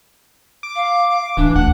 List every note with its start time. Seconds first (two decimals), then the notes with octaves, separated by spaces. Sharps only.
0.63 D6
0.75 F5
1.37 D1 E3 D4
1.56 D2 F#5